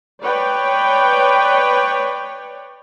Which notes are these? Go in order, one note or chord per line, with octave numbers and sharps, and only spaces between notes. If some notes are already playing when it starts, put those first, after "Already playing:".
B4 C#5 D5 G5